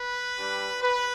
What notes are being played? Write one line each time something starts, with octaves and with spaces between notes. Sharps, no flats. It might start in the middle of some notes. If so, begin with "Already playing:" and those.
Already playing: B4
G3 D4 G4
B4